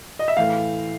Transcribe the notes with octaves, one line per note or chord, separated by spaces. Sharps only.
D#5
E5
A2 E3 A3 F5